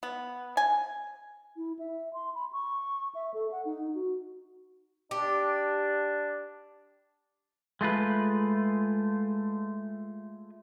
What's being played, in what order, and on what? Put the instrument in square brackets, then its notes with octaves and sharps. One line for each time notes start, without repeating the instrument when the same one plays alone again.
[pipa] B3
G#5
[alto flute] E4
E5
C6
B5
C#6
E5
A4
F#5
D#4
F#4
[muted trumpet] D4 [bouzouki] G4
[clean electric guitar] G#3 A3 F4 B4